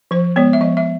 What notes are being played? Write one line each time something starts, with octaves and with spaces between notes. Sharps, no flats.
F3 C5
G#3 B3 C#5
E5
F3 D#5
E5